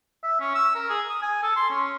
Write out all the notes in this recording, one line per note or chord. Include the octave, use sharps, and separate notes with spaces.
E5
C#4
E6
A#4
G#4
D#6
G#5
A4
C6
C#4